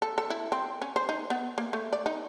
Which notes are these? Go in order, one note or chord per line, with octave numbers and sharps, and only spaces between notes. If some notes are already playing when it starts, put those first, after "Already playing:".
A4
A4
E4
C4
C#4
C5
D#4
B3
A#3
A3
D5
D#4